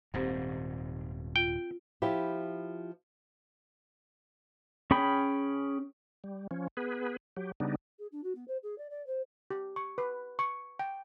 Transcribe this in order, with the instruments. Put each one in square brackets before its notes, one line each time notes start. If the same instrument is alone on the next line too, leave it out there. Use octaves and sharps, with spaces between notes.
[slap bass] D#1 G#2 [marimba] C4 G4 C5
[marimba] F4 [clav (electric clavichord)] G5
[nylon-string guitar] F3 E4 G4
[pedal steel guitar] C#4 G#4 G5 B5
[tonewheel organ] G3
F3 C#4
B3 G#4 B4
F#3 G4
C#3 G3 B3 D4 D#4
[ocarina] G#4
D4
F#4
B3
C5
G#4
D5
D5
C5
[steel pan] G4
C#6
B4
C#6
G5